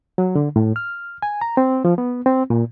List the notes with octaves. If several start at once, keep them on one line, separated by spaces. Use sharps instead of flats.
F#3
D3
A2
F6
G#5
A#5
C4
F3
B3
C4
A#2